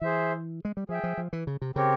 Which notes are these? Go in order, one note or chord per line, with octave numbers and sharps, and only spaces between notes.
E3 G#4 C5 E5
G#3
G3
F3 G#4 E5 G5
F3
F3
E3
C#3
C3
C#3 C4 G4 A#4 C#5